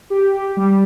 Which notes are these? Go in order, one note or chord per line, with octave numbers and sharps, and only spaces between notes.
G4
G4
G3